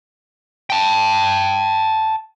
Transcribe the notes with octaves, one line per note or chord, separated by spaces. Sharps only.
G5 A5